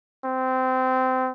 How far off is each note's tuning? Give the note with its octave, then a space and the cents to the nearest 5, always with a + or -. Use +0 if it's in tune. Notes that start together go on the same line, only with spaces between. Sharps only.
C4 -20